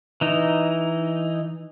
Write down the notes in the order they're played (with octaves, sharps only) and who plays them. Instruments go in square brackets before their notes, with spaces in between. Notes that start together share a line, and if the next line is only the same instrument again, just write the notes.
[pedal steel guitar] E3 D#4